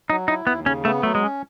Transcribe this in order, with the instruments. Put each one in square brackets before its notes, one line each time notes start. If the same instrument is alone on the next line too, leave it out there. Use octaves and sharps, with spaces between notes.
[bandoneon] F#3 [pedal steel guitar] D#4
[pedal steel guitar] D#4 [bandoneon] E4
[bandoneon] D#2 [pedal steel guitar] B3
[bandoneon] C#3 [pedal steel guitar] C#4
[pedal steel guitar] A3 [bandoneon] B3
[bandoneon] F#3 [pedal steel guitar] A3
[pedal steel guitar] G#3
[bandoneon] C#4